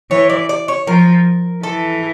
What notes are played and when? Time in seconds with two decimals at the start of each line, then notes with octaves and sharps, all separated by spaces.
0.11 E3 C#5
0.30 D5
0.49 D5
0.68 C#5
0.87 F3 A#4
1.63 E3 A4